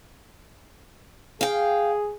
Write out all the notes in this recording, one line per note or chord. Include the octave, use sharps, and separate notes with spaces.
G#4 F5 G5